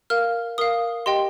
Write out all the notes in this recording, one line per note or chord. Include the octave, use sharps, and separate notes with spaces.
A#4 F5 F6
A#4 F5 D#6
G4 D#5 G5 C6